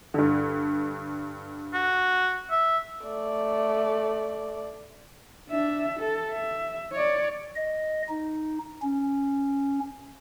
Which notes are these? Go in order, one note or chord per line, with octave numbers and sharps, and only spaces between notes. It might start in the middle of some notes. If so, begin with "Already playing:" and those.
G2 D3
F#4
E5
A3 D5
D4 E5
A4
E5
C#5 D5
D#5
D#4
C#4